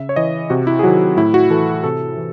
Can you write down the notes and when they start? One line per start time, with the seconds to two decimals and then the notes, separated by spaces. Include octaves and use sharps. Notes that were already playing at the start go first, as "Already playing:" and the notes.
Already playing: C#3 E5
0.09 C#5
0.16 E3 D#5
0.50 C3 F#4
0.67 E4
0.79 G#4
0.83 D#3 F#3 F#4
1.17 A2 E4
1.34 F#4
1.50 E3 A4
1.84 C3 A4
2.17 E3